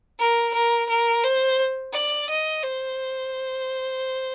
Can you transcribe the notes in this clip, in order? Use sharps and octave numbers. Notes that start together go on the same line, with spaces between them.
A#4
A#4
A#4
C5
D5
D#5
C5